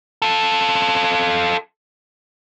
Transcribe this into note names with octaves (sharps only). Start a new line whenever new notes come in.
F4 A4